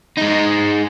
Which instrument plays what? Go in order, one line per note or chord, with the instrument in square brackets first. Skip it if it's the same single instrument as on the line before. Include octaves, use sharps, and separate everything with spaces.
[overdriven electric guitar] G#3 D#4